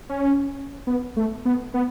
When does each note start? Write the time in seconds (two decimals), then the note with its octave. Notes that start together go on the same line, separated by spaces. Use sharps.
0.09 C#4
0.87 B3
1.17 A3
1.45 B3
1.74 B3